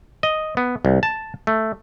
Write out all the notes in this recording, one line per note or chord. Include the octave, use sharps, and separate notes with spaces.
D#5
B3
C2
A5
A3